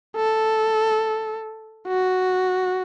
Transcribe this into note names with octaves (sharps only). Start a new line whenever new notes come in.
A4
F#4